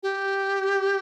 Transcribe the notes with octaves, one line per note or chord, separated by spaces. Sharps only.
G4